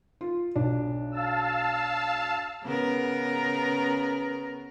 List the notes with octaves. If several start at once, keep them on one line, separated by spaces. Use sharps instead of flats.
F4
B1 D4
F5 A5 E6
C#3 B3 A#4